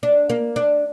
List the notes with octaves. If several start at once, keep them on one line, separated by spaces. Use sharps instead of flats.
D4
A#3
D4